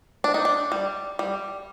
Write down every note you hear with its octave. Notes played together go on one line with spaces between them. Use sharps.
D4
D#4
D4
G3
G3